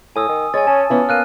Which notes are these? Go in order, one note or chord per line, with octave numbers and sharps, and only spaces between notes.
A2 G#5 D#6 E6
D#3
G#3 C#5 G#5 A6
C#4 A5
E3 B3 C#4 F4
A#3 F6 F#6 D#7